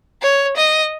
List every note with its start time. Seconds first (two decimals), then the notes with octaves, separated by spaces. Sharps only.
0.22 C#5
0.57 D#5